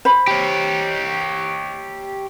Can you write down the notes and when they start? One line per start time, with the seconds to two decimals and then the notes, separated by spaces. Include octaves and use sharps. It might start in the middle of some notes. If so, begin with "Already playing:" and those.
0.05 C5 B5
0.27 G4 C#5